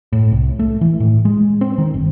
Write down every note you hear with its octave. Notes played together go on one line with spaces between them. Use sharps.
A2
C2
A3
E3
A2
G#3
C4
D#3
G1